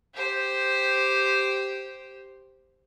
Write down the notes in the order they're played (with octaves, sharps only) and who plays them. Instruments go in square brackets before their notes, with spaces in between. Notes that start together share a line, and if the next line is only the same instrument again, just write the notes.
[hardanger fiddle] G4 C5